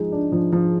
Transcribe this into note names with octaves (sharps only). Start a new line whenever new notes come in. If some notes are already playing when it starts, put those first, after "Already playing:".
Already playing: F3 G#3 D#4
D4
F3
F3